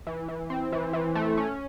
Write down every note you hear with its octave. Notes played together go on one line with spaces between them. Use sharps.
E3
E3
C4
E3
E3
A3
C#4